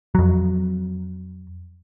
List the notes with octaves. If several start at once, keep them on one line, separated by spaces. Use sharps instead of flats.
F2 F#3